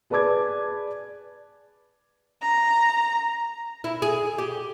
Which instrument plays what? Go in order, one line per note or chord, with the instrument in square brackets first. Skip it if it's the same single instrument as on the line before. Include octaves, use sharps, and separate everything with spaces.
[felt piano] G#4 B4 D5 A5 D6 G#6
[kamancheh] A#5
[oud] E4
G#4
G4